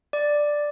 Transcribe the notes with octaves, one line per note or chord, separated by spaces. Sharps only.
D5